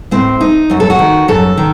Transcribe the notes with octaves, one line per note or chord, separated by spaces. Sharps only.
A2 C4
D#4
F#2 F#4
A4
F#4
D#3
F#2 A4
D#3